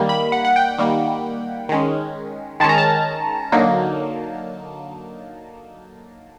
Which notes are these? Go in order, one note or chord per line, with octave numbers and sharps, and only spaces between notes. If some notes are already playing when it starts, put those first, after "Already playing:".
Already playing: D#3 G3 A#3
B5
F#5
F#5
G5
D#3 G3 A#3
D#3 G#3 C#4
D#3 G#3 C#4 A5
A#5
A5
D3 F#3 A#3 D#4